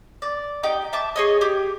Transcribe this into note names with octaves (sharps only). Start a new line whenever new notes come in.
D5
D#4 G4 G5
E5 A5 D6
G#4 C#5 D#5
G4